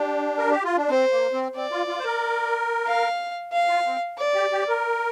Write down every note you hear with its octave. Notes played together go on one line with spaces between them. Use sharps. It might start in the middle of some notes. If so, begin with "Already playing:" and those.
Already playing: D4 G4
A#4
G4
F4
D4
C4 C5
A#3
C4
C4 D5
F4
F4
C5
A#4
F5
F5
F4
C4
D5
G4
G4
A#4